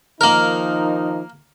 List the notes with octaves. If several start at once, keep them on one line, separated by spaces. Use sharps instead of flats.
D#3 F3 A#3 D#4 A#4